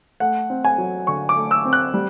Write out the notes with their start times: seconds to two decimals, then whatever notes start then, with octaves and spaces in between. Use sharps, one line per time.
0.20 A3 F#5
0.50 C4
0.65 G#5
0.78 F#3
1.07 D3 C#6
1.29 D6
1.36 A3
1.51 E6
1.65 C4
1.73 F#6
1.94 G3